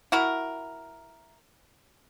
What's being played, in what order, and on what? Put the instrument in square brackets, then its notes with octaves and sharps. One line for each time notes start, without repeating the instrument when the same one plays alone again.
[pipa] E4 F#4 A#4